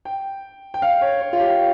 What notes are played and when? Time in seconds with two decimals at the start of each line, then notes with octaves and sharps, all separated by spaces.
0.05 G5
0.74 G5
0.82 F5
1.01 C#5
1.21 C#5
1.33 F4
1.40 G4